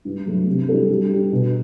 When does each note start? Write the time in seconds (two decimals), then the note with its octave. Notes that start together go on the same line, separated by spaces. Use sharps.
0.05 G2
0.25 F#3 A3
0.47 C3
0.69 G3 D4 A4
0.89 G3
1.11 D4 G4
1.32 B2